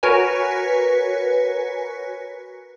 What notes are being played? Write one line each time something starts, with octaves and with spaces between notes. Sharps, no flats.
F#4 A#4 B4 C#5 G#5